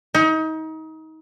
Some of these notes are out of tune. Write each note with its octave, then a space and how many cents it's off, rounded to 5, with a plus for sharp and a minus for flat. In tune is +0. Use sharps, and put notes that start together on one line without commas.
D#4 +30